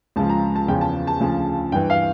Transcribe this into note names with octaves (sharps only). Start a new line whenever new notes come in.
C#2 C#3 F3 A5
A#5
A5
E2 C#3 F3 G5
A5
A5
D2 C#3 F3
G2 E3 G5
F5